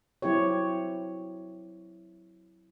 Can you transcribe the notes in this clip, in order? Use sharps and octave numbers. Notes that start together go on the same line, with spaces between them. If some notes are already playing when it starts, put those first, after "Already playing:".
F#3 C4 E4 G4 C#5